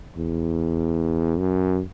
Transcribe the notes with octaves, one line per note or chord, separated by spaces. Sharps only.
E2
F#2